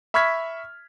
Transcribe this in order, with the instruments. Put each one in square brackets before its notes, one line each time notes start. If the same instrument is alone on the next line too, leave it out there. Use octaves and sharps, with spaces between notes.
[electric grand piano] E5 B5 C#6 F6 G#6 B6